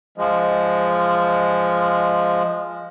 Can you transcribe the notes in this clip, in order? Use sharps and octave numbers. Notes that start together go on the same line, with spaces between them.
F3 G#3